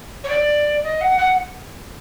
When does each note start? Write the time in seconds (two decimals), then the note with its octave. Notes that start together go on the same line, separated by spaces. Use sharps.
0.23 C#5
0.29 D5
0.83 D#5
1.00 F#5
1.17 F#5